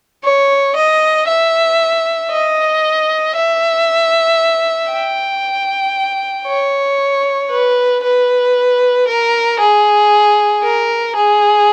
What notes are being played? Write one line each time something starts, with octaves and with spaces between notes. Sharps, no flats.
C#5
D#5
E5
D#5
E5
G5
C#5
B4
B4
A#4
G#4
A#4
G#4